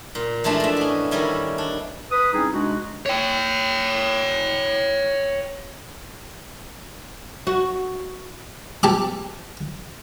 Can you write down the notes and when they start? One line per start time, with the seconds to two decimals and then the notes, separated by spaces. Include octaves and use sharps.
0.15 A#2
0.44 E3 F3 G#3 A3 D4 A5
0.60 A2 E5
0.77 B3 C#4
1.11 D#3 G3 C#4 E4
1.58 D4
2.11 B4 D#6
2.33 G3 C4 C#4 D#4 E4 G#4
2.53 C3 G#3 D4 D#4 F#4
3.06 C#5 G5
7.47 F#4
8.83 G4 A5 D6